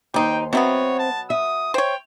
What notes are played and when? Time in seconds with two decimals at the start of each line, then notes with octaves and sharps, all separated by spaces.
0.14 D#2 G3 D#4 C5 G5
0.53 B2 F#3 B3 C4 C5 C#5 E5
0.99 A5
1.30 E5 D#6
1.74 C5 C#5 G5